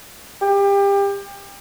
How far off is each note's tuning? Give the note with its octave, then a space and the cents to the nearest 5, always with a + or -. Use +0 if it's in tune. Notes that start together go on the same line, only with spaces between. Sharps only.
G4 +30